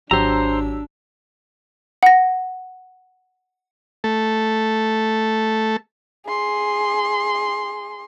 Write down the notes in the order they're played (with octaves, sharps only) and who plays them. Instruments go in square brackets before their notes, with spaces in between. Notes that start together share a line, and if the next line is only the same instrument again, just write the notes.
[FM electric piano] G#1 E6 [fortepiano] F#3 G4 [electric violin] D4 [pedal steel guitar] C5 A#5
[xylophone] F#5 A#6
[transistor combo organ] A3 A4
[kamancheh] G#4 C6